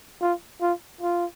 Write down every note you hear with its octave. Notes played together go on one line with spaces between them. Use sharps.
F4
F4
F4